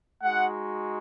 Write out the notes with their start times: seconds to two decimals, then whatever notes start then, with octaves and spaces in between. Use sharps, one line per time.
0.23 G#3 D#4 F#4 F#5